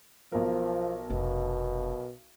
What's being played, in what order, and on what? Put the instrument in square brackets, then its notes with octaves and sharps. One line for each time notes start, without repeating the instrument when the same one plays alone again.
[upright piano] B1 A#4 [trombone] F3
[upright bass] F1 D4 [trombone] B2